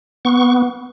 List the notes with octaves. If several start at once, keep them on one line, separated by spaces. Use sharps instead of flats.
B3 C#6